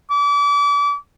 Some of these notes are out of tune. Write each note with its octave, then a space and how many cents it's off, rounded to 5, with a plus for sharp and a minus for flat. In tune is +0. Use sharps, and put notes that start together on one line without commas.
D6 -35